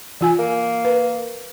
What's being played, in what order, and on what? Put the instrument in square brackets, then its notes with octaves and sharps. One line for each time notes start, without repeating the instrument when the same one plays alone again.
[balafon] E3 F4 G#5
[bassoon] A#3
[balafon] B4